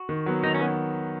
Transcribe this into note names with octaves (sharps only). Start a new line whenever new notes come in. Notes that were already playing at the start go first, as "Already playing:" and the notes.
Already playing: F#4
D#3
F#3 B3
D#3 D#4
C#4
F#3 B3